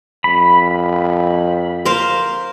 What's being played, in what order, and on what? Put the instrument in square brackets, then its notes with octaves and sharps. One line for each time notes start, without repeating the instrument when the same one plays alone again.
[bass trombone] F2 [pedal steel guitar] B5
[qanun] A#4 C5 F5